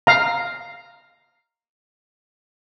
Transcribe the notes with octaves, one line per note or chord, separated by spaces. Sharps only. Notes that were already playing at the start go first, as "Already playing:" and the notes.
F5 A#5